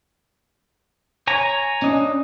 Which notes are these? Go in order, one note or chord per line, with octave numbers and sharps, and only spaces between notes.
C#5 G#5 A#5
C#4 D4 D#5